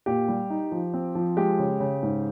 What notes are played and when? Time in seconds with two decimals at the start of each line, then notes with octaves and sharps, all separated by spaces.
0.06 A#2 G4
0.28 G3
0.50 D#4
0.72 F3
0.94 C4
1.15 F3
1.37 G#3 G4
1.59 C#3
1.80 C#3
2.03 G#2